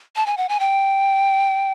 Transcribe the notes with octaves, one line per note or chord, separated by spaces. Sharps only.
A5
G#5
F#5
G#5
G5